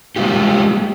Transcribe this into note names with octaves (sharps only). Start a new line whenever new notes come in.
G3 G#3 A#3 F4 G4